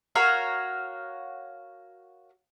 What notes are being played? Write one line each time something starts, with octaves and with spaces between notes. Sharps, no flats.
F#4 A#4 C#5 F5